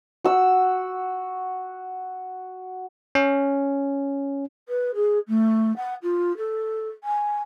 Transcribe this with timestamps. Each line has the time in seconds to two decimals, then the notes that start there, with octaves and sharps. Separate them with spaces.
0.24 F#4 E6
3.15 C#4
4.68 B4
4.94 G#4
5.28 A3
5.76 F#5
6.02 F4
6.37 A4
7.03 G#5